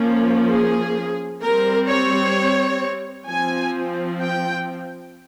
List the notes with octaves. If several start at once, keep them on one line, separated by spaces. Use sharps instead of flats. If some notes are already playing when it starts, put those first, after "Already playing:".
Already playing: F3 A#3 C#4
G#4
G3 C4 A#4
C#5
F3 C4 G#5
G5